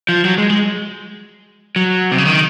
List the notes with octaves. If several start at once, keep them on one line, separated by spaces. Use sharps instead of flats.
F3
F#3
G#3
G#3
F#3
C3
C#3
D#3